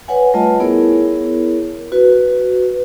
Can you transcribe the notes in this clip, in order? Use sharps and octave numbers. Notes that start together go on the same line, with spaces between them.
B4 C#5 F#5 G#5
G3 A3 F4 D#5 A5
B3 E4 G#4 A#4 C#5
F#4 B4